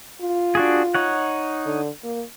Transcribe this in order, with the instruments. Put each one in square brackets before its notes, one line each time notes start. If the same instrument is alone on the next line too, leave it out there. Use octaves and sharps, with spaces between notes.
[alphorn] F4
[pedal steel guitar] D4 F#4 G#4
D#4 C#5 F#5
[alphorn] D3
A#3